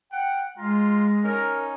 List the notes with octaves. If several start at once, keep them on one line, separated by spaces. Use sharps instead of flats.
F#5 G5
G#3 F4 A#5
C#4 D#4 A#4